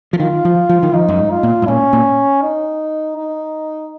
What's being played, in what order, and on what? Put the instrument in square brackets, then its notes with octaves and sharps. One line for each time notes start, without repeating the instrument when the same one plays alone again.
[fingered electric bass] F3
[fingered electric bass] D#3 [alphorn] F4
[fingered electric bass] F3
F3
D#3
[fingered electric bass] F3 [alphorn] D#4
[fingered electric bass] F#2
G#2
[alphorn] F4
[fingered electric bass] A#2
G#2
[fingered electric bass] A#2 [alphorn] C#4
[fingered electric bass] A#2
[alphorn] D#4
D#4